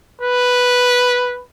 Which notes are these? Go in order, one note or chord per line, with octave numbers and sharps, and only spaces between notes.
B4